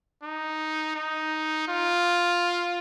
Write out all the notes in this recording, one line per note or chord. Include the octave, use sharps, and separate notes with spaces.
D#4
D#4
F4